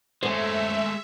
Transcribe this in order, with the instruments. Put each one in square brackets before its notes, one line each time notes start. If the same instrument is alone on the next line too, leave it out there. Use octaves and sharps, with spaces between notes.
[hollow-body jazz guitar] F#2 A4 C5 [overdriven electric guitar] G#3 A3 [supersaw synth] E5